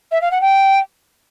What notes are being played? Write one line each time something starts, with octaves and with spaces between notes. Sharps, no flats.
E5
F5
F#5
G5